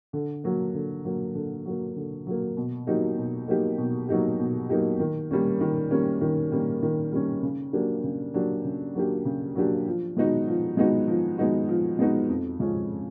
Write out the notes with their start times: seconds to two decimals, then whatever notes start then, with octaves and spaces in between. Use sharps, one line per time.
0.13 D3
0.44 F#3 A#3
0.74 D3
1.05 F#3 A#3
1.35 D3
1.65 F#3 A#3
1.96 D3
2.26 F#3 A#3
2.57 B2
2.87 F#3 A#3 D#4 G4
3.18 B2
3.48 F#3 A#3 D#4 G4
3.78 B2
4.08 F#3 A#3 D#4 G4
4.39 B2
4.69 F#3 A#3 D#4 G4
5.00 D#3
5.31 G3 A#3 C#4
5.61 D#3
5.91 G3 A#3 C#4
6.21 D#3
6.52 G3 A#3 C#4
6.83 D#3
7.12 G3 A#3 C#4
7.43 C#3
7.73 F#3 A#3 D4 G4
8.03 C#3
8.34 F#3 A#3 D4 G4
8.64 C#3
8.95 F#3 A#3 D4 G4
9.25 C#3
9.55 F#3 A#3 D4 G4
9.86 F3
10.17 G#3 B3 D#4 F#4
10.47 F3
10.77 G#3 B3 D#4 F#4
11.07 F3
11.38 G#3 B3 D#4 F#4
11.69 F3
11.99 G#3 B3 D#4 F#4
12.29 F2
12.60 C#3 F3 G#3 C#4